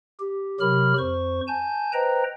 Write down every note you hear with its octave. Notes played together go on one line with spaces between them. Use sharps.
G4
C3 F#3 G4 A#4 B5 F6
F2 C5 C#6
G#5 A5 G6
B4 C5 D#5 G5 A#5